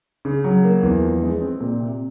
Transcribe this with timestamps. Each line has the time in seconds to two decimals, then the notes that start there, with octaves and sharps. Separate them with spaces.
0.25 C#3
0.44 F#3
0.64 A#3
0.83 E2
1.02 F3
1.22 G#3
1.41 C4
1.61 A#2
1.80 C3